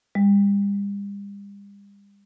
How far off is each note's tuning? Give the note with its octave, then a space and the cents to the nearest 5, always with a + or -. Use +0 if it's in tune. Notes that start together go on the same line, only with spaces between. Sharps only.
G3 +40